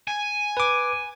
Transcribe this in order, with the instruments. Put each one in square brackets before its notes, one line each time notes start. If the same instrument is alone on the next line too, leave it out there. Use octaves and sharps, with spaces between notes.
[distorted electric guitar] G#5
[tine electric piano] B4 D6